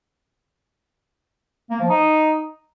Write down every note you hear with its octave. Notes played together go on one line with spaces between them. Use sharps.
A#3
F3
D#4